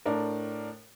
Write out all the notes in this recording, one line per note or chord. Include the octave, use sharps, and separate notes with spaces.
A2 D4 A#4